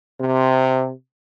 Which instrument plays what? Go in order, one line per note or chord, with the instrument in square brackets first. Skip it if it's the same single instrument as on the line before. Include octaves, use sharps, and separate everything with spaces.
[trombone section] C3